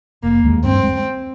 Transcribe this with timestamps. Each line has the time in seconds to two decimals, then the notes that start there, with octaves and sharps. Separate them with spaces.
0.23 F1 A#3
0.44 D#2 D#3 G#3
0.63 G2 C4
0.84 G#3